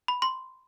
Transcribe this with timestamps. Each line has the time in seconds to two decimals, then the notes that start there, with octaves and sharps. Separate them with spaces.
0.08 B5
0.22 C6